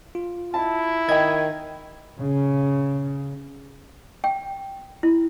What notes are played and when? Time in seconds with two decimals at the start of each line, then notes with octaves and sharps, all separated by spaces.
0.15 F4
0.54 E4 A5
1.09 D#3 D#5 G5 G#6
2.18 C#3
4.24 G5
5.03 E4